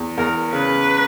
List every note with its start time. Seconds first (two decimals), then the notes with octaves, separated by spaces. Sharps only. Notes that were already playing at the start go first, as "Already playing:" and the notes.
Already playing: E2
0.18 E2 A#4
0.53 C#3 B4